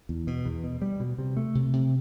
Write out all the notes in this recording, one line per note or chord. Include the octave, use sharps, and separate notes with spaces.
E2
B2
E2
B2
G3
B2
C3
A3
C3
C3